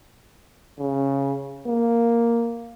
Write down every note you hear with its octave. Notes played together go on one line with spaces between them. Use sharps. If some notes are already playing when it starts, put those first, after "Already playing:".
C#3
A#3